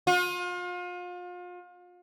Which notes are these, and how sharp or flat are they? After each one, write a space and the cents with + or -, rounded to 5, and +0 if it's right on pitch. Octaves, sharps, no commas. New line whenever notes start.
F4 +35